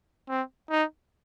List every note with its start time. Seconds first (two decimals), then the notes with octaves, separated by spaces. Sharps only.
0.29 C4
0.71 D#4